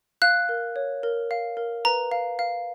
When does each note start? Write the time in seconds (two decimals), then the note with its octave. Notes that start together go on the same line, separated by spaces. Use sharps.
0.22 F5 F#6
0.49 A#4
0.76 C#5
1.03 A#4
1.31 F5
1.57 A#4
1.85 B4 A#5
2.12 F5
2.39 F5